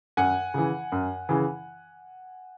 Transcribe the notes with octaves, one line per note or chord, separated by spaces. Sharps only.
F#2 F#5 G#5
C#3 E3
F#2
C#3 E3